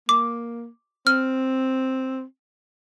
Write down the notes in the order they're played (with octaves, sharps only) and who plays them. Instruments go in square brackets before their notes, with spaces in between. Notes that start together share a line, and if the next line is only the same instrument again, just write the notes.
[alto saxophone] A#3 [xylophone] D6
[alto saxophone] C4 [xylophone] F6